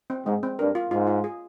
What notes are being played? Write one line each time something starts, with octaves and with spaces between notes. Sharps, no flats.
C4
G#2 G#3
C4
G2 A#4
F4
G#2 F4
F4
G#4